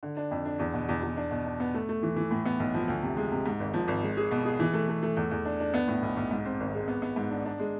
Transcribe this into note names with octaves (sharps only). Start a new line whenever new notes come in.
D3
D4
F2
D4
E2
B2
E2
E2
D4
B2
D4
B3
A3
A3
E3
E3
A2
B3
B1
F3
D2
C3
G#3
C3
G#2
G#1
F3
G#1
G#3
G#4
B2
G#4
E3
A3
A3
A3
E2
E2
D4
D4
B3
A2
B1
B1
G#2
C4
G#1
G#3
B3
B3
G#2
D4
D4
G#3